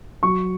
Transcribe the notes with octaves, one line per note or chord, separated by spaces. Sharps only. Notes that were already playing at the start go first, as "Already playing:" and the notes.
F#3 C#6